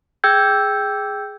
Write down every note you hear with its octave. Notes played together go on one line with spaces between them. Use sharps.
G#4 G5 E6 G6 G#6